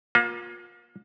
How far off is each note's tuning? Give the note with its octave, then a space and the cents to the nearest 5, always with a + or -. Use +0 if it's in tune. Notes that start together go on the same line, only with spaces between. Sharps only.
A#3 +30 F4 +35